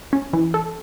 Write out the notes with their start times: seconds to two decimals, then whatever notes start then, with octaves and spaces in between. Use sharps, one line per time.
0.13 C#4
0.33 E3
0.54 A4